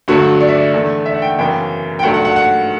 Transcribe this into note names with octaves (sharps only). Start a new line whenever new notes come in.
G2 D3 F#3 A3 F#4
D5
E5
D5
E2 D3 A3
E5
F#5
G5
F#2 C#3 E3 B3 G5
G5
G2 F#3 A3 F#5
F#5
F#5
F#5